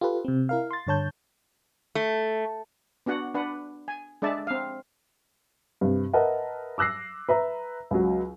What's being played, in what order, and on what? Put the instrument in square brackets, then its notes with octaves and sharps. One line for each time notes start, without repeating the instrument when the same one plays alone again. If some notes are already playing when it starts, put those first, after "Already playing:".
[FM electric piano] F4 G4 A4 B4
C3 C4
E4 A#4 F5
C6 A6
G2 D3 C#5 A5 G6
[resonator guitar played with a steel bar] A3
[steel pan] B3 D4 F#4 F#5
D4 B4 F#5
G#5
G#3 D4 D5 E5 A5
C4 F5
[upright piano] G2 C3
A#4 B4 D#5 E5 F#5 A5
D6 E6 F#6 A#6 C7
B4 E5 A#5
C#2 F#3